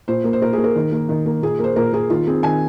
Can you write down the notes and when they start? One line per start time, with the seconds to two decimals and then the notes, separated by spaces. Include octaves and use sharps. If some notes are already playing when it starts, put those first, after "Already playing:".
0.08 A#2 C5
0.24 A#3
0.33 C5
0.41 A#2 A#4
0.53 G#4
0.58 A#3
0.64 A#4
0.76 D#3
0.92 A#3
1.09 D#3
1.26 A#3
1.42 A#2 G#4
1.59 A#3 C5
1.76 A#2 A#4
1.93 A#3 G#4
2.10 D#3 F4
2.27 C4 G#4
2.43 D#3 G#5